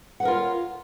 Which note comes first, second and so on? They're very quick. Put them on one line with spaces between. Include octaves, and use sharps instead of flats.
F#5 B4 A#4 F4 C#5